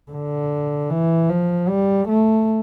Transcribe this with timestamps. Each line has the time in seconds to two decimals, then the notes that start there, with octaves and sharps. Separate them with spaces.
0.12 D3
0.90 E3
1.29 F3
1.69 G3
2.09 A3